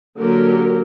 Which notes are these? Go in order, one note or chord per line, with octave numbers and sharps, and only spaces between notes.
D3 F#3 A#3 G4 A#4